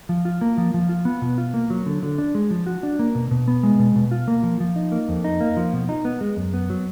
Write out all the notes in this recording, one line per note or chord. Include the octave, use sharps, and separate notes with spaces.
F3
F4
A#3
F3
F3
F4
B3
B2
F4
A#3
F#3
D3
D3
D4
G#3
F3
F#4
D4
A#3
B2
B2
B3
G#3
B2
B2
F4
A#3
F3
F3
D#4
A#3
F2
D#4
A#3
F3
B2
D#4
B3
G#3
F#2
B3
F#3